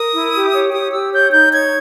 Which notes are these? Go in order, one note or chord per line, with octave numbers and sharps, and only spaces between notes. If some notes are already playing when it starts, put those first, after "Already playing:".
Already playing: A#4 D#6
E4
G4
C#5
G4 D#6
G4 E6
C#5 G6
D#4 G6
C#5 G#6